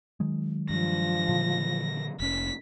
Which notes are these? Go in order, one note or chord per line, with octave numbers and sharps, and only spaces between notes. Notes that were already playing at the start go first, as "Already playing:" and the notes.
D#3 F#3 G#3
G2 F3 A#6
A#2 D3 E3
F1 C#4 B6